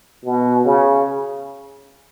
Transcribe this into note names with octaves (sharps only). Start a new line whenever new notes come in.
B2
C#3